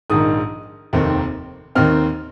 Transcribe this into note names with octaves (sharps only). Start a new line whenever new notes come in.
A#1 G#2 D#3 D#6
F1 D#2 D#3 C4
D#2 D#3 C4 F6